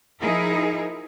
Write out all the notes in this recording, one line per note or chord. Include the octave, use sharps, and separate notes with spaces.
F3 D#4 E4 G#4 A#4